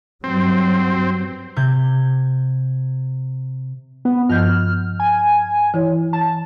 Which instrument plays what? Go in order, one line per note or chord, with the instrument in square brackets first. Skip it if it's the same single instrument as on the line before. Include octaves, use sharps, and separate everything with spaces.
[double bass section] G2 F#3 [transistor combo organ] C4
[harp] C3 G6 G#6
[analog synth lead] B3
[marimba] G2 F3 G6 [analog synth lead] F6
[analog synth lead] G#5
[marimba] E3 E4 C#5
[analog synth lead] A5